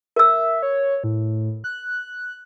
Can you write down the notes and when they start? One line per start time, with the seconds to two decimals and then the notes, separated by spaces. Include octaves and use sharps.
0.16 A#4 E5 E6
0.63 C#5
1.04 A2
1.64 F#6